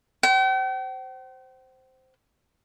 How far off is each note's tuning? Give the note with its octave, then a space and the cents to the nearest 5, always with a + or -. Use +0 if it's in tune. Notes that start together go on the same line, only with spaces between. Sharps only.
C5 +0 G5 -45